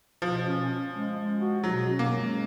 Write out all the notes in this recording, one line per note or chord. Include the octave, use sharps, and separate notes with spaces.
B2 F3
C#4
C#4
G#3
G#3
F#4
B2 F#3
C#4
A#3
G#3